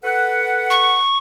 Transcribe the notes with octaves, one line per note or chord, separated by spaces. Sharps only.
A4 B4 F#5
C#6